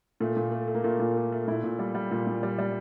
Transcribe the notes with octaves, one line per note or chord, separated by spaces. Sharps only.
A#2 A3
A#2
A3
A3
A#3
A#2 A3
A#2
A3
A3
A#2 E4
A#2
G3
G3
A#2
A#2
G3
G3